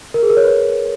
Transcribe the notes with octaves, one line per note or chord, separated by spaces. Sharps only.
A#4
G#4
A#4
C#5
B4